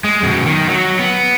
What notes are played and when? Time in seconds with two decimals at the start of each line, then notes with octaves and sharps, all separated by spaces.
0.04 G#3
0.23 F#2 B2
0.46 D#3
0.69 F#3
0.99 B3